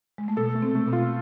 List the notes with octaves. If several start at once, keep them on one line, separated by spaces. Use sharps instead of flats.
G#3
A3
B2 B3 A4
A3
C3 C4
A3
B2 B3
F4